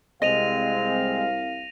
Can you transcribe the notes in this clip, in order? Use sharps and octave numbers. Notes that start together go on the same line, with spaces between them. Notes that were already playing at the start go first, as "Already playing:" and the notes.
C2 G#3 C4 D#5 F5 A#6 D#7 F7